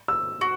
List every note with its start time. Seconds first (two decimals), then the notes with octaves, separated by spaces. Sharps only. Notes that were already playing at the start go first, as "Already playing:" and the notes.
0.08 E6
0.41 F#4